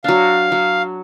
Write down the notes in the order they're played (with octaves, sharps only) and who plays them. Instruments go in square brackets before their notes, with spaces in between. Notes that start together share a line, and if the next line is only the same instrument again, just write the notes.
[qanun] F#3 D4 [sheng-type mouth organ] F5
[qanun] F#3